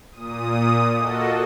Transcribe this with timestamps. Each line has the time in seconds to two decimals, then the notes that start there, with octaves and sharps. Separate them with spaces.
0.12 A#2 D#6
0.96 A#3 F#4 A4 D#5